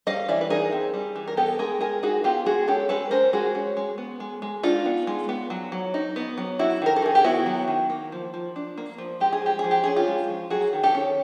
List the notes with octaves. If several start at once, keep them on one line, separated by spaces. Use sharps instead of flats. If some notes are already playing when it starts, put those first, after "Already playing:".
G3 D#5 F5
E3 D5 E5
B4
D#4 G#4 A#4
C4
G3
E3
A#4
B3 G4 A4
G#3 G#4 A#4
G#3 G#4 A#4
D#4 F#4 G#4
B3 F4 G4
G#3 F#4 G#4
C#4 G4 A4
G#3 A4 B4
C#4 A#4 C5
G#3 F#4 G#4
C#4
G#3
B3
G#3
G#3
D4 D#4 F4
B3
G#3
B3
F#3
F#3
D#4
B3
F#3
F#3 E4 F#4
D#3 A#4
A4
D#3 G#4
G4
B3 E4 F#4
F#3
D#3
A#3
F3
F3
D4
A#3
F3
G#3 G4
G#4
F3 G4
G#4
F3
G4
C#4 G#4
F4 G4
G#3
F3
F#3 F#4 G#4
D#3
G4 A4
C#4